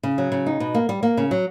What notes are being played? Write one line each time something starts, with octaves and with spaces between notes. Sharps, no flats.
C#3
F#3
C#3
D#4
B2
A#3
G3
A#3
C#3
F#3